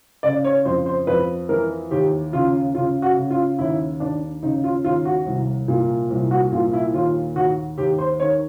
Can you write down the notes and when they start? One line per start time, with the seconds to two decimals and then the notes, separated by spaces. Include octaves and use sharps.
0.23 C#3 D5
0.44 C#5
0.65 F2 C5
0.86 C5
1.07 F2 B4
1.49 E3 A#4
1.91 D#2 G4
2.32 C#3 F4
2.75 C#3 F4
3.02 F#4
3.17 C#3
3.31 F4
3.59 D#2 E4
4.00 D#2 D4
4.42 C#3 D#4
4.64 F4
4.84 D#2 F4
5.05 F#4
5.26 C2
5.68 A#2
6.10 C2
6.31 F#4
6.52 A#2 F4
6.73 E4
6.94 D#2 F4
7.35 D#2 F#4
7.78 D#2 G4
7.98 C5
8.20 D#3 C#5